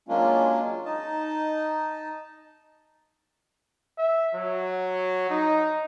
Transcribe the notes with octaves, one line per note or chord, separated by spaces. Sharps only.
F#3 G#3 A#3 C#4 D4 F4
D#4 D#5 A5
E5
F#3
D#4